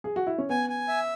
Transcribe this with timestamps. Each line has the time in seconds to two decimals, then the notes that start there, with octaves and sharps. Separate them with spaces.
0.04 G#4
0.16 F#4
0.27 E4
0.38 C#4
0.49 B3 G#5
0.70 G#5
0.88 E5